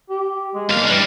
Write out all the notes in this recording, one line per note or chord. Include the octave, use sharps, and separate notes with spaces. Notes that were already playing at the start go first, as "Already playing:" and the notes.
G4
G#3
B1 A#3 F5
E3 G3 D4